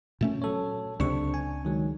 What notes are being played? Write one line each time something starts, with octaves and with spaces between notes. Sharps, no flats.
A#2 A3 C#4
F#3 A4 C#5
C#2 C3 D4 C#6
G#5
D#3 F#3 G#3